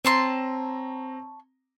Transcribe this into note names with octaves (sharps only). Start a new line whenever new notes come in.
C4 C#5 A5 A#5 C6